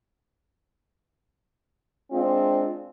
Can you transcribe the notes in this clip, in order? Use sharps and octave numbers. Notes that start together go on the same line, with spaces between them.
G#3 C4 D4 F4